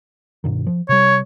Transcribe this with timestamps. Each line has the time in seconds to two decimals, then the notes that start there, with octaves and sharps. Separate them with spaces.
0.44 G2 B2 D#3
0.67 F3
0.89 C3 G3 C#5